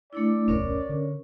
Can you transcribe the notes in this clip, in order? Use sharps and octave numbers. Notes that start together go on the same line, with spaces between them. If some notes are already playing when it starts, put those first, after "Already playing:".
A3 D4 E4 D5
D1 B1 F#2 C#4 A#4 C#5
D3